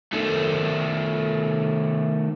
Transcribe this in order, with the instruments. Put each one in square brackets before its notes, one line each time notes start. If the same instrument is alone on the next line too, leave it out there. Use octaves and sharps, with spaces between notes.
[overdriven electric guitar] D#3 A3